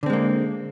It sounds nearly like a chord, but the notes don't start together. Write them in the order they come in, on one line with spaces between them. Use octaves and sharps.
D3 C4 G#3 A#3